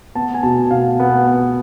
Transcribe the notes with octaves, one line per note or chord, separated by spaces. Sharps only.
B3 A5
G#5
B2 A5
B2 F5
B3
B3